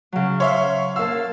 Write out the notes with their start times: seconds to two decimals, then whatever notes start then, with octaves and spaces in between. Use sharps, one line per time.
0.12 C#3 F#3
0.40 C#5 E5 F5 C6
0.96 A#3 F5 A5 E6